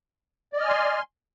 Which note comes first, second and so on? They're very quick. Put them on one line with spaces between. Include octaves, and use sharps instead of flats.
D5 D#5 F6 G#5 C6